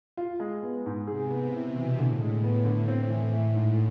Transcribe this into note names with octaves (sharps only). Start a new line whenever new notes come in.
F4
G#3
B3
G#2
C3 G#4
B3
B2 E4
E3
A2 D3
G#3
A2 B3
D3
C4
E3
A2 A3
G#2